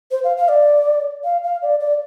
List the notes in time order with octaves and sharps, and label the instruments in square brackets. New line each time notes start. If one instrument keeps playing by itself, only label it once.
[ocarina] C5
F5
F5
D5
F5
F5
D5
D5